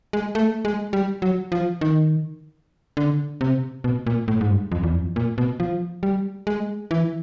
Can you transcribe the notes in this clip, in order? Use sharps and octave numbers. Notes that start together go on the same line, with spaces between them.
G#3
A3
G#3
G3
F#3
F3
D#3
D3
C3
B2
A#2
A2
G#2
G2
F2
E2
F2
A#2
B2
F3
G3
G#3
E3